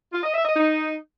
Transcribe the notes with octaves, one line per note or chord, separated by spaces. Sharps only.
F4
D#5
E5
D#5
D#4